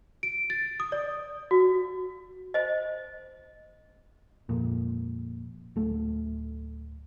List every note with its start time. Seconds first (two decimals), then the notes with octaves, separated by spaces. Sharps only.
0.23 D7
0.50 A6
0.80 D#6
0.92 D5
1.51 F#4
2.54 C5 D#5
4.49 F2 A#2
5.76 D1 A3